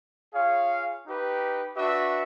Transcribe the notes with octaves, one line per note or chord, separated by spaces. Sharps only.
F4 G#4 C#5 F5
D#4 G4 B4
D4 F#4 B4 E5